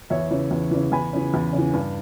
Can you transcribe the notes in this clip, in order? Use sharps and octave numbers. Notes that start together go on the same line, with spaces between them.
E2 C#5 E5
C#3 E3
E2
C#3 E3
E2 G#5 B5
C#3 E3
E2
C#3
E3
G2